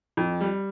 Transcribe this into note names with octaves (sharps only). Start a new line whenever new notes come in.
F2
G3